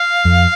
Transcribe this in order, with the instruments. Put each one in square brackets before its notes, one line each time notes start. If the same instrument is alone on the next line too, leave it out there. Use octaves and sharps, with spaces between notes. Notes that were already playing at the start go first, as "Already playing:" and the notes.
Already playing: [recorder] F5
[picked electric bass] F2